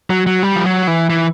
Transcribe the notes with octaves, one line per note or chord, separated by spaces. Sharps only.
F#3
F#3
G3
F3
F#3
E3
E3